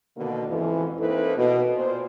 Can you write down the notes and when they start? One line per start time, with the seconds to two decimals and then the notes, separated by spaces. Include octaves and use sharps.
0.16 B2 D3 D#3 A#3
0.47 F2 G#2 C#3 E3
0.99 A#3 C4 D#4 E4 A4 B4
1.36 B2
1.75 A#2 C5